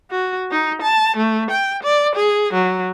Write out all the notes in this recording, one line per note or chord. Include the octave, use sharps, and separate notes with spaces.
F#4
D#4
A5
A3
G5
D5
G#4
F#3